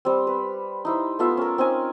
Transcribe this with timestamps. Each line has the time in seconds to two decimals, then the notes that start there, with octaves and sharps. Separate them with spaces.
0.05 G3 C4
0.27 B4
0.85 D#4 E4 C5
1.19 A3 B3 F4 E5
1.37 C#4 A#4
1.58 C4 C#4 D#4 G#5